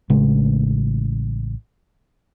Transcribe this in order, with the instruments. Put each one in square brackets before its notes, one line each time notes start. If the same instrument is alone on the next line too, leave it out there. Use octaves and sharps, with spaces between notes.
[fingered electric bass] A1 C#3 G#3